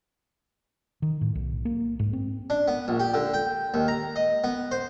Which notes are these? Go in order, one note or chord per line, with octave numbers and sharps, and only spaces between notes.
D#3
A2
B1
A#3
G#2
C4
D4
B3
A#1
G4
D3
G5
D#2
A#5
D#5
B3
C5